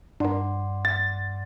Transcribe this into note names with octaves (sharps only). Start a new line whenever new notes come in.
G2 D4 A#4 D5 F#5 C6
A6